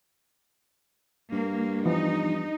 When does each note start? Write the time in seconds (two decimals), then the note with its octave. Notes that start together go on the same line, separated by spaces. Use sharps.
1.32 G2 A#3
1.86 E3 F3 B3 D#4